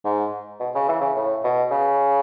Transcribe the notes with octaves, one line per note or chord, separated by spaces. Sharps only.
G#2
B2
C#3
E3
C#3
A2
B2
C#3